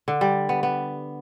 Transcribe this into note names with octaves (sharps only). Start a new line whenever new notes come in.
D3
G3
B3
B3